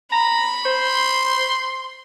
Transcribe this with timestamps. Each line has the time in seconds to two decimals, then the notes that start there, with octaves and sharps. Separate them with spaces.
0.12 A#5 B5
0.65 C5 C6